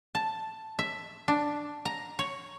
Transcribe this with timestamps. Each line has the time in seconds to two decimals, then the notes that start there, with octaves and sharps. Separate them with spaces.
0.15 A5
0.79 E5
1.28 D4
1.85 A#5
2.19 C#5